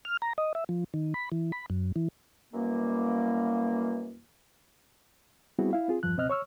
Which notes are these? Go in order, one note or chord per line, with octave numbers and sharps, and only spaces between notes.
F6
A#5
D#5
E5
F3
D#3
B5
E3
B5
F#2
E3
F#2 B2 E3 G3 A#3
G3 B3 C4 E4 F#4 G#4
E4 F5
C4 F4 G#4
E2 G2 F3 F#6
C#2 B2 C4 D#5 F6 F#6
C#5 C#6 E6 F6